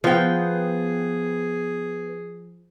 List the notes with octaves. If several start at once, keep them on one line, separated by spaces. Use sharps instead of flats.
F3 B3 G#4 G5